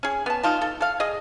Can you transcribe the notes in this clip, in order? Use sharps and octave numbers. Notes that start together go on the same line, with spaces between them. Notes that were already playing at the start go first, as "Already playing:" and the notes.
C#4 G#4
B3 A5
D#4 F4 A5
A4
A4 F5
G#4 D#5